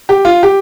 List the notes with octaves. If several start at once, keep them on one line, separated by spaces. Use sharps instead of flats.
G4
F4
G4